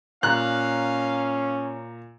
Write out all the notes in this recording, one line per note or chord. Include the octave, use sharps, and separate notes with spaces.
A#2 C#4 F5 A#5 F#6